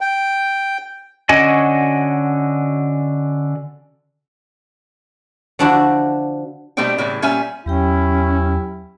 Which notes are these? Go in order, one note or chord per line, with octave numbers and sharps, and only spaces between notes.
G5
D3 C#4 F#4 D#5 G#5
D3 F3 D4 E4 F#4
B2 G3 A3 C4 D4 G5
A2 C#3 E3
A#2 G3 C#4 E5 G#5
E2 F#3 C#4 E4 G4 G5